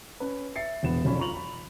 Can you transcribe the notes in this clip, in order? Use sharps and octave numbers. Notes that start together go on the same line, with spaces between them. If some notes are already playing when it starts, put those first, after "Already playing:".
C#4 B4
E5 A6 C7 C#7
E1 A#1 E2 B3 E7
E1 B1 F2 C#4 D5 B5
F4 A#5 C#6 F7 F#7
B5